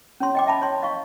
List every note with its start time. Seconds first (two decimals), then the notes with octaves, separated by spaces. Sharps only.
0.20 C#4 C#5 C6
0.35 D#5 G5 D6
0.47 E5 A5 B5
0.62 C#5 C6
0.82 D#5 F5 C#6